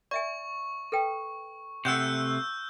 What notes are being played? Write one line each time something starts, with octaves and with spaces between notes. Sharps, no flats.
D5 E5 G#5 C#6
A4 B4 G5
C3 A3 F#5 C6 E6 F#6 G6